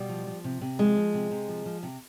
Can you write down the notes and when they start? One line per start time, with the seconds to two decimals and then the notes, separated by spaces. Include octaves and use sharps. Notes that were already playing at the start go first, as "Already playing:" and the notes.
Already playing: B2 G3
0.09 F3
0.27 F3
0.44 C3
0.61 C3
0.79 F3 G#3
0.97 F3
1.14 C3
1.31 C3
1.48 F3
1.66 F3
1.83 C3